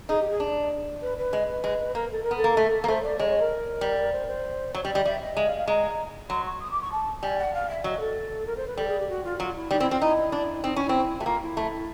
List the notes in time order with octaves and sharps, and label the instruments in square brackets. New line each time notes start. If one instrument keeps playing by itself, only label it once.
[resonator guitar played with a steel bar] D#4 [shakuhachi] G#4
[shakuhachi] G4
G#4
[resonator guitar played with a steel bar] D4
[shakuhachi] B4
B4
[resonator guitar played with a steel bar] G#3
G#3
[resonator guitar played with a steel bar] A#3 [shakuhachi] A#4
[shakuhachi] A4
A#4
[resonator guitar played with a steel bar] B3
[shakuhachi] A4
[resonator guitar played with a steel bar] A#3
A3
A#3
[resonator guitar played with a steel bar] A3 [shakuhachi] C5
[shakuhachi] D5
[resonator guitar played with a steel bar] G#3 [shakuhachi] C#5
[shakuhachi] C#5
A#4
[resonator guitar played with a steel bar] G3
[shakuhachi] C5
C5
[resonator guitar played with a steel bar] F#3 [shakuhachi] C#5
[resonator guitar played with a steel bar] G3 [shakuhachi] D5
[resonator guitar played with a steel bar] G3 [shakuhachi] D#5
[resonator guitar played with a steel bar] G3 [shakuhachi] E5
[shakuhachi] D#5
[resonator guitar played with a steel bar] G#3 [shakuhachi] E5
[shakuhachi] F5
F5
[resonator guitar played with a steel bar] G#3 [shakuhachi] A#5
[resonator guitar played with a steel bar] F#3 [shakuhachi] C6
[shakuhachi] C#6
D#6
D6
C#6
A5
[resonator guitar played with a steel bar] G3 [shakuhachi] G#5
[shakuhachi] F#5
F5
E5
[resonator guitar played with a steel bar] F#3 [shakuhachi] D#5
[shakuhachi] A4
A#4
C5
B4
[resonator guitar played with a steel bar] G3 [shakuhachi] A4
[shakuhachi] G#4
G4
F#4
F4
[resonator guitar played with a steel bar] F#3 [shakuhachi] F4
[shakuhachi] E4
[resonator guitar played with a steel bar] G3 [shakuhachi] D#4
[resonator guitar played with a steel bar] C4 [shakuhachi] E4
[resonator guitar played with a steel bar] C4 [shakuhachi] F4
[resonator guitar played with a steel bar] D#4 [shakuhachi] E4
[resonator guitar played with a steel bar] D4
[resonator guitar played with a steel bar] C4 [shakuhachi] D#4
[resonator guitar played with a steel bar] C#4 [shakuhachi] E4
[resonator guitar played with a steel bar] C4 [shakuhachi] E4
[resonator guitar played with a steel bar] A3 [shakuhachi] F#4
[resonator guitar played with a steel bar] A#3 [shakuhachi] F4
[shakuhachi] E4
[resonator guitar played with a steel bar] A3